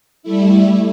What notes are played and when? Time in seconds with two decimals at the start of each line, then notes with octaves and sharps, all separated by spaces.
0.23 G3 A3 E4